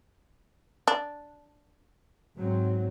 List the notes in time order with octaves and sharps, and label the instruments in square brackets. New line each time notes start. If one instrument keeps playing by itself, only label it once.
[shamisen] D4
[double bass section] G#2 F#3 C4